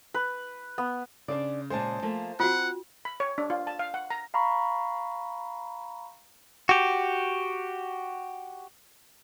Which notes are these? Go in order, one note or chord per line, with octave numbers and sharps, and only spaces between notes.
B4
B3
C#3 D4 C5 D5
A#2 C#3 G#3 C5 G#5 A5
F3 A3 A#3
C4 F4 F#4 F#5
B5
C#5
D4
F4
A5
F5
F#5
A#5
F5 A#5 B5 C#6
F#4 G4